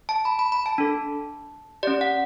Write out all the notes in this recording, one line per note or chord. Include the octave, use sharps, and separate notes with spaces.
A5
B5
B5
B5
A5
D4 A4
C#4 G4 D5
F#5